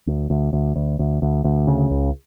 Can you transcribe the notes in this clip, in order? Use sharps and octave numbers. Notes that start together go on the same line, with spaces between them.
D2
D2
D2
D2
D2
D2
D2
C#3
C#2